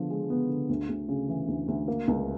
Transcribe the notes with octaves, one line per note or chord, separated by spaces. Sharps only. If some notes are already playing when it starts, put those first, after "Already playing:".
Already playing: D3 F3 B3
G#3
B3
D3
D2
D2
C#3
E3
D2
D2
A#3
C#2